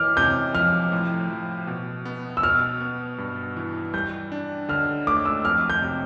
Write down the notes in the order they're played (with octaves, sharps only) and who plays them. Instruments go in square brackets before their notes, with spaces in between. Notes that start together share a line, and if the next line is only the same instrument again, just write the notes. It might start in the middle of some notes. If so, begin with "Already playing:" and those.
Already playing: [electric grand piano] E3 [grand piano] D6 F6
[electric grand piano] C3 [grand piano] G6
[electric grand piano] F3 [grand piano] F6
[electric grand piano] A2
F3
B2
B3
[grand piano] E6
[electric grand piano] B2 [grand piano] F6
[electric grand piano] B3
G2
E3
[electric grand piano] G3 [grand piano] G6
[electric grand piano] D4
[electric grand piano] D3 [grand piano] F6
[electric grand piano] A3 [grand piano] D6
[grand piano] E6
[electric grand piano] F2 [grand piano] F6
[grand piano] G6
[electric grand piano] C3